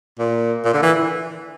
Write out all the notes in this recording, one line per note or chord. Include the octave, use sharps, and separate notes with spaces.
A#2
A#2
D3
E3